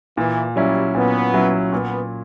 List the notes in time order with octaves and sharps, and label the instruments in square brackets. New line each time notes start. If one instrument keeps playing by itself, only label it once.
[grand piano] A#2 [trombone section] E3
[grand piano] F#3 C#4 E4 [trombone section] G3
[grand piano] A#2 [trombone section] B3
[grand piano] F#3 C#4 E4
[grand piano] A#2 [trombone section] B3